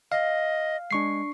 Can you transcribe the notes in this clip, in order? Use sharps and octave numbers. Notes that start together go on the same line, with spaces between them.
D#5 F5
G#3 D4 C#6 C7